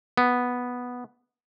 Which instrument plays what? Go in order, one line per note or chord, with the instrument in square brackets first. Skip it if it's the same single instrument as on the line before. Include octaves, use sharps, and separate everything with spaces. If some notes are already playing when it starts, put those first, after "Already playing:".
[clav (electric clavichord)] B3